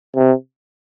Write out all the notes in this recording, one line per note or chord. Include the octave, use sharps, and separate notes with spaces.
C3